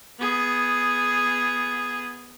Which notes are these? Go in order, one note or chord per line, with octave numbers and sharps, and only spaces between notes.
B3 G#4